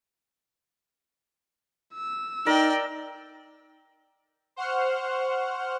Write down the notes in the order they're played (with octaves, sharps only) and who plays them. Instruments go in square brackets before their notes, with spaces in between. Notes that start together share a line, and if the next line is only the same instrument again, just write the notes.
[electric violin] E6
[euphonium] D#4 [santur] A#4 [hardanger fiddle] D5 G5
[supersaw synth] C5 F#5 C#6 F6